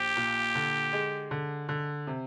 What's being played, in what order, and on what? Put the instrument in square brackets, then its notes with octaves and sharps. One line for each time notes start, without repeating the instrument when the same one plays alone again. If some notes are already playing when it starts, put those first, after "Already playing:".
Already playing: [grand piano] A#1 [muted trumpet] G4
[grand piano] A#2
D3
G#3
D3
D3
C3